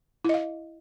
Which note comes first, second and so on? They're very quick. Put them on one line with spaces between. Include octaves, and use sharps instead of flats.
E4 D#5 F5